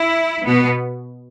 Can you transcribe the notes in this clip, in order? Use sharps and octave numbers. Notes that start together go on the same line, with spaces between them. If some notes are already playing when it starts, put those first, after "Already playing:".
Already playing: E4
B2 B3